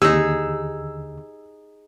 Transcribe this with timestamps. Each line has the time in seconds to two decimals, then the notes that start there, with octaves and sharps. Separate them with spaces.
0.02 D#2 D3 D#4 G4 G#4 E6